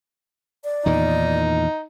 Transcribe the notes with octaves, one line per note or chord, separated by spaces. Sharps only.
D5
E2 A#2 D#3 D#4